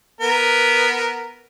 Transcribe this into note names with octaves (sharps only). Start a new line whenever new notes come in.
B3 A#4